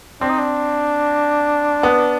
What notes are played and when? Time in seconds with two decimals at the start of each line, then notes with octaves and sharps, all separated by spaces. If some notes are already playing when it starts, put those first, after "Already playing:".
0.21 C4 D4
0.30 D#4
0.39 D4
1.83 B3